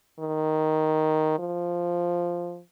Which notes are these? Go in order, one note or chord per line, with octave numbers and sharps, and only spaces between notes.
D#3
F3